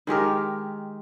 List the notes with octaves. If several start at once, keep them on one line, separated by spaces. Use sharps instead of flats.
D#3 G#3 G4 A#4